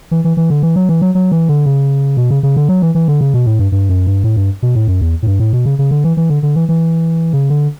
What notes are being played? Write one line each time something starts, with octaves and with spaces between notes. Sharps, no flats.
E3
E3
E3
D3
E3
F#3
E3
F#3
F#3
E3
D3
C#3
B2
C#3
C#3
D3
F#3
E3
E3
D3
C#3
B2
A2
G2
G2
F#2
G2
A2
G2
B2
A2
F#2
E2
A2
G2
A2
B2
C#3
C#3
D3
E3
E3
D3
D3
E3
E3
C#3
D3